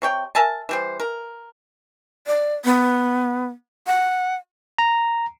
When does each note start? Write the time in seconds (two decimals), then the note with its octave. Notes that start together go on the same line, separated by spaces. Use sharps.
0.02 C3 C#5 G5
0.35 A#4 E5 G#5 A5
0.69 E3 G3 C5
1.00 A#4
2.27 D5
2.65 B3
3.87 F#5
4.78 A#5